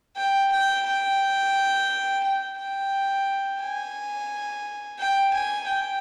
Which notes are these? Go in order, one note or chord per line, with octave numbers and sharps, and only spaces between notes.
G5
G5
G5
G5
G5
G#5
G5
G#5
G5